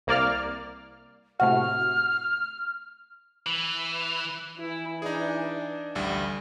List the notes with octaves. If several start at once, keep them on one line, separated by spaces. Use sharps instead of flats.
C2 A#3 D5 F6
A2 C3 F#4 F6
E3
E3 E4
D4 D#4 G#4
A1 D2 G3